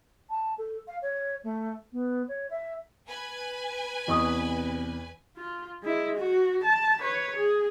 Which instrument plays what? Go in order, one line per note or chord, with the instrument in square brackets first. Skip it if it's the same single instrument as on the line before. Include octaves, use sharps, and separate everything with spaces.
[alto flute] A5
A4
F5
C#5
A3
B3
C#5
E5
[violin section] B4 G#5
[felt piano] E2 [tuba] C3 [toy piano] D#5 C#6 D#6
[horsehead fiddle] F4
G#3 E4
F#4
A5
B4 C#5
G#4